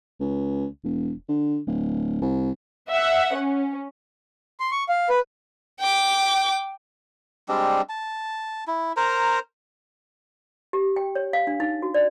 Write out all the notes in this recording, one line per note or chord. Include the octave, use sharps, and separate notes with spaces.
C#2
E1
D3
D1
C2
E5 F#5
C#4
C6
C#6
F5
B4
G5 D6
G3 G#3 C4 D4
A5
E4
A#4 C5 A#5
G4
G5
C#5
F5
D4
D#4
F#4
D5